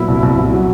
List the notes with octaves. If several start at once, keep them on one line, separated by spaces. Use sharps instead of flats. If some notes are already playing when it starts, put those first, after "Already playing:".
Already playing: A#2 F#3 B3 E4
C2
C2
C2
F#3